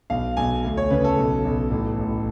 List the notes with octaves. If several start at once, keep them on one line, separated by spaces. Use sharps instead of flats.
B1 F5
B1 G#5
D2
C#5
C#3 B4
A4
B1
B1
A1
A1